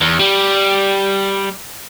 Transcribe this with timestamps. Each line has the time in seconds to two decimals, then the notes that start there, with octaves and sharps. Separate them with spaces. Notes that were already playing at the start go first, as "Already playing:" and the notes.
0.01 E2
0.19 G3